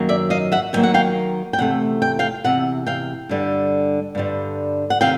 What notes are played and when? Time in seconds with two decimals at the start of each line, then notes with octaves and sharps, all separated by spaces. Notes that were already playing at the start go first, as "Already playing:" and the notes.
Already playing: F#2 D#3 F#3 A#3
0.09 D5 E5
0.30 D#5 F5
0.52 E5 F#5
0.73 F#2 D#3 F#3 A#3 G5
0.83 F#5
0.94 F5 G5
1.53 G5
1.58 E2 C3 A3 F#5
2.02 G5
2.19 F5 G5
2.44 E2 C3 F#5
2.86 F5 G5
3.29 G2 D3 G3
4.15 G2 D3 G3
4.90 F#5
5.01 C3 D#3 F5 G5